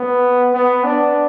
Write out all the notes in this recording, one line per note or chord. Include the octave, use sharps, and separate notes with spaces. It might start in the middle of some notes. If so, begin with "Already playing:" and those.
Already playing: B3
B3
D4